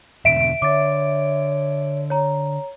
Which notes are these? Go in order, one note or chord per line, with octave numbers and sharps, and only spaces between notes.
E2 B2 D3 E5 D7
D3 C#5 D6 A6
C#5 A#5